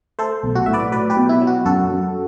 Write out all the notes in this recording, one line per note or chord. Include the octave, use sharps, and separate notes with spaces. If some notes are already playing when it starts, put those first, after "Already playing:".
A3 A4 C5
B1
F#4
A2 E5
B4 D5
F#3 B4 D5
G4 B4
B2
E4
F#3
F#4
F#2 F#4 A4
F#2